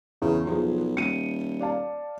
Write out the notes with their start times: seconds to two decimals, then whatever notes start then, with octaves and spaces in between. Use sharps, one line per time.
0.22 E2 C#3
0.47 B1 F3 G#4
0.97 D#1 C#7 D#7
1.60 D5 F5 A5